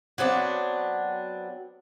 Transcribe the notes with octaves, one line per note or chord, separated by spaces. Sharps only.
F#3 B3 C4 D4